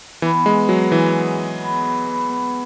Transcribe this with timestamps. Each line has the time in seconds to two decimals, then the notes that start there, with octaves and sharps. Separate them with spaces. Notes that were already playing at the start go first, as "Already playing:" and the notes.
0.22 E3 B3
0.46 G#3 B4
0.69 F#3 G#4
0.91 E3 G#4
1.15 G#4
1.37 G#4
1.60 B3
1.83 B4
2.06 B3
2.30 B3